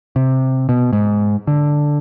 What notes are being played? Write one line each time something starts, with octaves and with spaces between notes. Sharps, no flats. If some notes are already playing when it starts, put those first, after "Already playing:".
C3
B2
G#2
D3